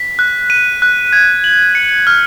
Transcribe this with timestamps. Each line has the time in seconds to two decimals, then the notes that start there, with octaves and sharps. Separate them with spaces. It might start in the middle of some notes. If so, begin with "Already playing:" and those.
Already playing: B6
0.19 F#6
0.50 D#7
0.82 F#6
1.13 G#6
1.44 F#7
1.75 C#7
2.07 F6